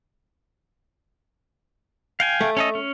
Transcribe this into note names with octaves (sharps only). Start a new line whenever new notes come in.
F5 G5 G#5
A3
C#4 A4 D#5
C#4